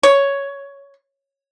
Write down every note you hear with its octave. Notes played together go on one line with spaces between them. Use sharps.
C#5